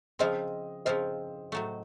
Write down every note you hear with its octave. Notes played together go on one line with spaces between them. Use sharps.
C#3 F3 C4 F4 C5 D#5
C#3 F3 C4 F4 C5 D#5
A2 F#3 A3